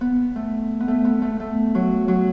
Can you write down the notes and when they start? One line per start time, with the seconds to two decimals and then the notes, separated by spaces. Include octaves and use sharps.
0.01 B3
0.36 A3
0.80 B3
0.88 A3
1.05 B3
1.22 A3
1.40 A3
1.75 F#3
2.08 F#3